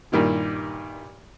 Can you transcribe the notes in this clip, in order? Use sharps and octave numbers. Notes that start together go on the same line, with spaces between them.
G2 A#2 D#3 G3 E4